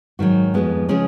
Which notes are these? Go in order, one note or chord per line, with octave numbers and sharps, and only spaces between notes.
G#2 D#3 F#3 F#4
F2 F3 G#3 B3
C#3 F3 G#3 C#4 G#4